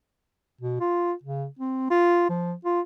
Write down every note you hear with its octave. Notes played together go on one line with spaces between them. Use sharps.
B2
F4
C#3
C4
F4
F3
F4